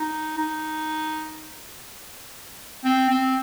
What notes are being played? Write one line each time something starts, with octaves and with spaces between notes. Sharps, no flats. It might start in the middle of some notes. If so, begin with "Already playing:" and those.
Already playing: D#4
D#4
C4
C4